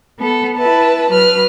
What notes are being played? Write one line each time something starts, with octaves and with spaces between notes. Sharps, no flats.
B3 A4
E4 B4 A5
F#3 B4 F6